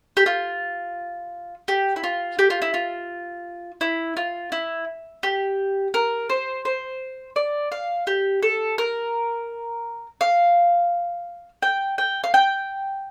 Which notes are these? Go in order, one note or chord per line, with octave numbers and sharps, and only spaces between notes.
G4
F4
G4
E4
F4
G4
F4
E4
F4
E4
F4
E4
G4
A#4
C5
C5
D5
F5
G4
A4
A#4
F5
G5
G5
F5
G5